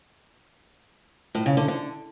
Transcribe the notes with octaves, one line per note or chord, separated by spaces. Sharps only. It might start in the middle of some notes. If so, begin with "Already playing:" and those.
A2
C#3
D3
D3